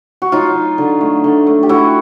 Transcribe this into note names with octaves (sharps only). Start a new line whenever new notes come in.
F#4
F#3 D#4 F4
F#3
D3
A3
D3
A3
G4
A3 E4 F#4